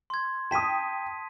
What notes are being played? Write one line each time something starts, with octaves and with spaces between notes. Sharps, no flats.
C6 G#6
G5 A5 D#6 B6 D#7